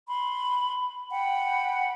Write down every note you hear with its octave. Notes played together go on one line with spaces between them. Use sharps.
B5 C6
F#5 G5 B5